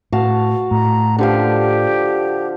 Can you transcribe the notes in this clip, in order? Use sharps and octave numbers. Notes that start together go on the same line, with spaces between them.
A2 F#4 F5 A5
A2 A#5
D3 F3 G4 F5